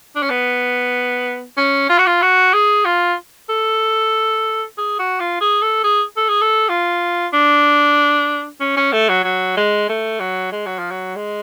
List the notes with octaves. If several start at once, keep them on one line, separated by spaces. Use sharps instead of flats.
D4
C#4
B3
C#4
F4
F#4
F4
F#4
G#4
F4
A4
G#4
F#4
F4
G#4
A4
G#4
A4
G#4
A4
F4
D4
C#4
C#4
A3
F#3
F#3
G#3
A3
F#3
G#3
F#3
F3
F#3
G#3